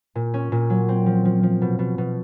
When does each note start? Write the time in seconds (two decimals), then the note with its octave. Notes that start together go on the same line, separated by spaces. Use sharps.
0.15 A#2
0.34 C#4
0.52 A#2
0.70 F#3
0.89 C4
1.06 F3
1.25 F3
1.43 F3
1.62 B2
1.79 B2
1.98 B2